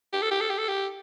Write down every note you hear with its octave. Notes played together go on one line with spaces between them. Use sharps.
G4
A4
G4
A4
G4
A4
G4